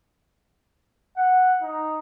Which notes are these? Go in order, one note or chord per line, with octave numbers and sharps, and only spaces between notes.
F#5
D#4